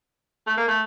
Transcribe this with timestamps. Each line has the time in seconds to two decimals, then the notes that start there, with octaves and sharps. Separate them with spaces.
0.47 A3
0.57 A#3
0.68 A3